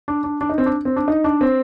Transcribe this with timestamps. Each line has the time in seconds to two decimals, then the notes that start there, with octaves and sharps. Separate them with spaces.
0.08 D4
0.24 D4
0.41 D4
0.50 D#4
0.58 C4
0.66 D4
0.85 C4
0.96 D4
1.08 D#4
1.24 D4
1.41 C4